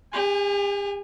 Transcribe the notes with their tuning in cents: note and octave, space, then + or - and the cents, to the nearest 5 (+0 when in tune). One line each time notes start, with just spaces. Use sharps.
G4 +45 G#5 -10